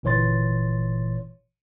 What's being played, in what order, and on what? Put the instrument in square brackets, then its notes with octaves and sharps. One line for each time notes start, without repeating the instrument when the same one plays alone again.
[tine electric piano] G1 A#2 E3 C#5 C6 A6